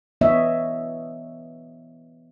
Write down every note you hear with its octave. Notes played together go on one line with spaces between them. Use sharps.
E3 B3 D4 C#5 D#5 E5